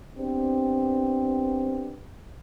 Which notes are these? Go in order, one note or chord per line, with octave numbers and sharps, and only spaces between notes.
B3 C4 D4 G4